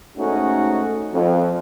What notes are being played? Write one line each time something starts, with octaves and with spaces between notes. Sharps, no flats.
G#2 A3 C#4 D#4 F#4
F2